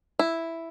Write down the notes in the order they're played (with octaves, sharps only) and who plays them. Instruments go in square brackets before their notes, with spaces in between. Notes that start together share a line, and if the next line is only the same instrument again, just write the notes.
[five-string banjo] E4